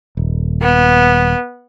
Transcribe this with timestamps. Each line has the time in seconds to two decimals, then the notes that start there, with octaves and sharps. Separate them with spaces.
0.17 D#1
0.62 B3